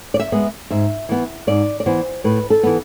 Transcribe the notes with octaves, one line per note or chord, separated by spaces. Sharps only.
D5
E5
G#3 B3
G#2 E5
E3 B3
G#2 D5
D5
E3 B3 C5
A2 B4
A4
E3 B3